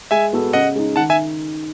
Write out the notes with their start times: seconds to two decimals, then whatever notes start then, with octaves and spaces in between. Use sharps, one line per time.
0.11 G#3 E5 G#5
0.33 B3 F#4 A4
0.53 C#3 D#5 F#5
0.75 G#3 D#4
0.96 D#3 F#5 A5
1.10 E5 G#5